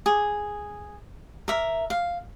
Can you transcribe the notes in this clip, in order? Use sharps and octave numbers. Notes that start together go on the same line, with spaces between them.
G#4
A#4 E5
F5